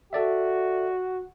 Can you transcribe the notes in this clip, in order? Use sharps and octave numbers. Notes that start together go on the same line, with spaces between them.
F#4 A4 D5 E5